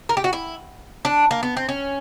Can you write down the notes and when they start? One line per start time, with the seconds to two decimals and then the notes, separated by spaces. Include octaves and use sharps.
0.09 A#4
0.17 G4
0.24 F#4
0.33 E4
1.05 D4
1.31 A#3
1.43 B3
1.57 C4
1.69 C#4